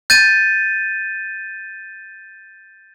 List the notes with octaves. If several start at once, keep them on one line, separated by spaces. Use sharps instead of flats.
G6 A6 D#7